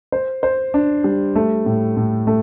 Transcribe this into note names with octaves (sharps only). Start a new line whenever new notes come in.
C5
C5
D4
G3
A3
A2
A2
A3